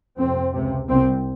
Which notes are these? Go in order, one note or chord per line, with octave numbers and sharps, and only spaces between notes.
F2 C3 C4
C#2 C3
C2 C3 C4